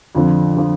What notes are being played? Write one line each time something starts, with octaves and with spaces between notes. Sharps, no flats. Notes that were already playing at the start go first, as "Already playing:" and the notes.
F2 D3 F3
D3 F3